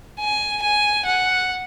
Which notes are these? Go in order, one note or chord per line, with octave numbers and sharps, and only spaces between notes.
G#5
G#5
F#5